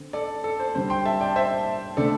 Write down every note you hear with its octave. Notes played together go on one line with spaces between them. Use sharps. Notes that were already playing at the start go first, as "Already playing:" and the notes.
Already playing: D3 C4
A4 D5
A4
C5
D3 G3 C4 C5
G5 C6
E5 A5
D5 G5
C5 E5
D3 A3 C4 A4 D5